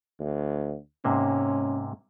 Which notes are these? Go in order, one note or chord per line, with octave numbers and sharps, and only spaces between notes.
D2
G#2 C3 A#3 C#4